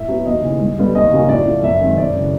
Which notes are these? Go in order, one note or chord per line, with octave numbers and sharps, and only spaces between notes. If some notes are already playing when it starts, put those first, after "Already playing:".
Already playing: A2 E5
F#3 B3
D#2 D#5
C#3 E3
G2
D3 G3 B3
D#2 D#5
C#3 F#3 A#3 C#4
A2 D5
F3 A3
F#2 E5
D#3 G#3 C4
F#2 D5
C#3 E3 A3